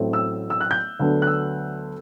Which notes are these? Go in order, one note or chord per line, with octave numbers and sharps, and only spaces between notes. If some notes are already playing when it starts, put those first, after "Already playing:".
Already playing: A1 A2 F#3 A3 C4
E6
E6
F#6
G6
D2 D3 F#3 B3 D4
F#6
E6